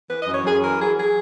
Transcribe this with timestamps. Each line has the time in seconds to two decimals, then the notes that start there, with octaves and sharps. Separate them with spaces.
0.08 E3 B4
0.20 D#5
0.27 F#2
0.33 C#5
0.44 F#2 G#4
0.62 E3 A#4
0.79 F#3 G#4
0.97 F#3 G#4